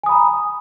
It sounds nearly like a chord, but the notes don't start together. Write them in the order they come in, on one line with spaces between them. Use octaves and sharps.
G#5 D#6 B5 A#5